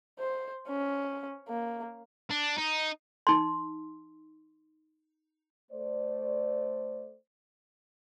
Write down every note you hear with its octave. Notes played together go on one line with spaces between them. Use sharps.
C5
C#4
A#3
D4
D#4
D#4 C6
A3 C5 D5